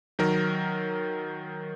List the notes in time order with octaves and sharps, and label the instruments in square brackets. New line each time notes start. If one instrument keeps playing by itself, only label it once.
[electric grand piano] D#3 F#3 A#4